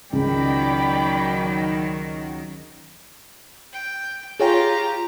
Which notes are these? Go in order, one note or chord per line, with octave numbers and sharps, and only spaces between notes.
C#2 D#3 F#3 D5 G5 B5
G5
F4 G4 G#4 C#5 G5 A#5